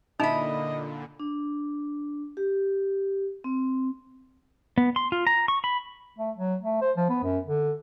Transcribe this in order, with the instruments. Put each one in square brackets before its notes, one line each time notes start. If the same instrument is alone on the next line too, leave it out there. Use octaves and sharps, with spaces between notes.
[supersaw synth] A#2 D3 [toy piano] D#4 [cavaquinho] E4 B5 [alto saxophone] D#5
[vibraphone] D4
G4
C4
[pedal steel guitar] B3
C6
F4
A#5
C#6
B5
[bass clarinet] A3
F#3
A3
C5
F3
B3
F#2
D3